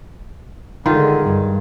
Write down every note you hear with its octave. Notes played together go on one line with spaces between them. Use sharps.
D3 D#3 G#3 F4
G2